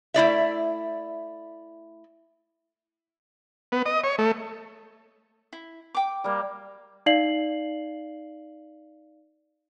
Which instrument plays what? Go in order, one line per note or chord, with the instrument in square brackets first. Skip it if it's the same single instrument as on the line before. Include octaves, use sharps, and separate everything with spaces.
[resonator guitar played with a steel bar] A3 E4 D5 E5
[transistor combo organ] B3
D#5
C#5
A3
[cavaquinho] E4
G5 D6
[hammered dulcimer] G3 A#3
[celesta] D#4 D5 F5 C7 F#7